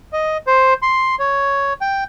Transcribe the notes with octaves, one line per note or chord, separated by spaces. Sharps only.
D#5
C5
C6
C#5
G5